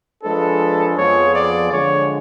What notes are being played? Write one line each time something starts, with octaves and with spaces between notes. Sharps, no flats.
F3 G#3 D4 G#4 A4 B4
F2 F3 B3 F4 G#4 C#5
D5
D3 F3 G#3 C#5